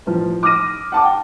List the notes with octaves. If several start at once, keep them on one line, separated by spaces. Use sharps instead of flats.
A1 F3
D6 D#6 F6 A#6 D#7
F#5 A5 D6
G5